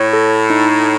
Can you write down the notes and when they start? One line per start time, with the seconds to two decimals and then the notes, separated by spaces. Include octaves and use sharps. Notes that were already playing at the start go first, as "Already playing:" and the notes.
Already playing: A2 C#5
0.13 A4
0.50 D#4